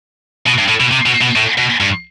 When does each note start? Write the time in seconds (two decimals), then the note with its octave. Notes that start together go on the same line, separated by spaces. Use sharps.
0.47 B2
0.59 G2
0.69 A2
0.80 B2
0.91 C3
1.06 B2
1.22 B2
1.36 A2
1.58 B2
1.80 G2